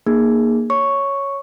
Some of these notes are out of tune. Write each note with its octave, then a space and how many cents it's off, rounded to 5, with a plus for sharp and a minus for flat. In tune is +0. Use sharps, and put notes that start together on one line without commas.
A#3 +0 D#4 -35 G#4 +0
C#5 +0 C#6 +0